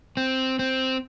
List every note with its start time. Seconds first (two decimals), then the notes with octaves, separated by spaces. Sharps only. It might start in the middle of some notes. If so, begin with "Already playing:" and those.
0.17 C4
0.59 C4